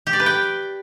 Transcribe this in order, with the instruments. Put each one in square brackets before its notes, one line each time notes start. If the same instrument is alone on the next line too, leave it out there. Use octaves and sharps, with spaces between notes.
[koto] G4
D5
B4
G5